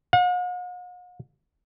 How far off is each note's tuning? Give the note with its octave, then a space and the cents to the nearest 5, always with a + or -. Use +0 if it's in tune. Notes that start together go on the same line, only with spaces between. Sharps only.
F#5 -45